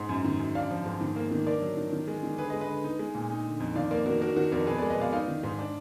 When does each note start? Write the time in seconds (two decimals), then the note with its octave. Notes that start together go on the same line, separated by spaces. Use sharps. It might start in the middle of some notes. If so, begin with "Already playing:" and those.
Already playing: G#2 F#5
0.09 F#2
0.24 D#3
0.40 F#2
0.55 D4 D5 F5
0.70 F3
0.86 G#2
1.01 D#3
1.16 A#3
1.32 D#3
1.47 D4 A#4 D5
1.62 F#3
1.77 D#3
1.93 D#3
2.08 G#3
2.23 D#3
2.38 D3 G#4 B4
2.50 B4 D#5
2.54 G#3
2.61 B4 D#5
2.68 D3
2.84 D#4
2.99 G#3
3.15 A#2
3.30 D#4
3.45 D3
3.60 F2
3.75 D#3 D5 F5
3.91 A#3 A#4 D5
4.06 D#3 F#4 A#4
4.21 D4 F#4 A#4
4.36 D#3 F#4 A#4
4.52 F2 A#4 D5
4.67 B2 G#4 B4
4.78 G#3 A#4 D5
4.90 B4 D#5
4.98 B2 D5 F5
5.13 D#4 D5 F5
5.28 D#3
5.43 G#2
5.59 D4